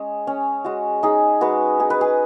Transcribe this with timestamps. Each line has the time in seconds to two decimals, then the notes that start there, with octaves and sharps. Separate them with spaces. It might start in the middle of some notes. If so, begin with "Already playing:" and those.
Already playing: G#3 C#4 G#4
0.27 C#4
0.65 G#3 F#4
1.03 D#4 G#4
1.41 G#3 F#4 B4
1.79 D#4 G#4
1.90 B4
2.01 G#4